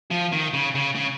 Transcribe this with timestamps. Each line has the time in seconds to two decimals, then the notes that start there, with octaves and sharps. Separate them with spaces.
0.11 F3
0.32 D#3
0.54 C#3
0.75 C#3
0.95 C#3